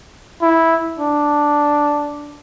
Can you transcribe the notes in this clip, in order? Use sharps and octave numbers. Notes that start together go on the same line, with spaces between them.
E4
D4